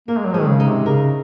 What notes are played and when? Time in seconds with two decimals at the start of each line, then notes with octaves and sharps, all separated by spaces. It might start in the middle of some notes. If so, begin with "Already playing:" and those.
0.08 A#3 A#4
0.17 G#3
0.25 F#3
0.32 F3 G#3
0.40 D#3
0.47 C#3
0.60 D#4
0.67 C3
0.86 C#3 A#4